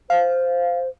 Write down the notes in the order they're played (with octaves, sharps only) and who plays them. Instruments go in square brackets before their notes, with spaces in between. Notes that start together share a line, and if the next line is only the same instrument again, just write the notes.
[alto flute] C5 [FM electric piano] F5